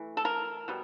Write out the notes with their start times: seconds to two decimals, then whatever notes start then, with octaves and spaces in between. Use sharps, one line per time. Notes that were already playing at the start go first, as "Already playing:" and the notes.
Already playing: E3 A3
0.17 A4
0.25 A#4
0.68 B2 G3